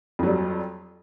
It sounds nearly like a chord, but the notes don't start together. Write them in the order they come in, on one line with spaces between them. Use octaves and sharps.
F2 F#3 G3